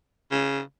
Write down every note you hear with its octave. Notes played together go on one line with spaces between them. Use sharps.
C#3